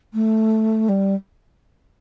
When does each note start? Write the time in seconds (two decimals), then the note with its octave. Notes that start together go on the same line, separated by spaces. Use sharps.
0.14 A3
0.89 G3